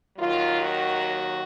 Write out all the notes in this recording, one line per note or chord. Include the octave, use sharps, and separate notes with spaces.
D#2 D#3 F#3 F4
F#4